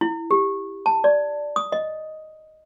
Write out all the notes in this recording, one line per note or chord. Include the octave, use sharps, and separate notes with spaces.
E4
G4
A5
D5
D#6
D#5